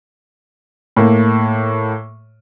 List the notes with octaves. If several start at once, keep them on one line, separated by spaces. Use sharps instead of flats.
A2 A#3